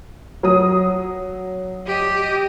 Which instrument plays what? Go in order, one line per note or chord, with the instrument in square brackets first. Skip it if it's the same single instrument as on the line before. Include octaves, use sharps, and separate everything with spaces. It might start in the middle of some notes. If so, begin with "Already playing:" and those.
[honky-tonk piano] F#3 D#6
[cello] G4 D#5